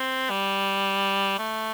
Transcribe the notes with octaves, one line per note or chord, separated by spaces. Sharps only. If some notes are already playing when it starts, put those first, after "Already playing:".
Already playing: C4
G3
A3